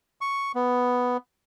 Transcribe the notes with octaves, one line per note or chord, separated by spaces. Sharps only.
C#6
B3